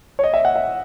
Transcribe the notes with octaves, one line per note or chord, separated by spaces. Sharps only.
C#5
D#5
E5
F#5
E5